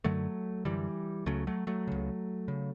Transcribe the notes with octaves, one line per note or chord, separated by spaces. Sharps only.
F#2 D3 F#3 A3
F#2 D3 E3 G3
C#2 C#3 F#3 A3
F#3 A3
F#3 A3
C#2 C#3
C#3